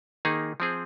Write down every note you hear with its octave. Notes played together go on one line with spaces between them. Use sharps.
D#3 A#3 D#4 G#4
F3 C4 G#4